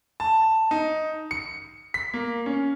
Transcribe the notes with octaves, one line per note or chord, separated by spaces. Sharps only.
A5
D#4
C#7
B6
A#3
C#4